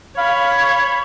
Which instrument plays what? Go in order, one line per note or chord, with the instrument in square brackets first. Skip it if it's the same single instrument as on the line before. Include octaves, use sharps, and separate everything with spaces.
[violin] C#5 [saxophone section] F5 [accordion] B5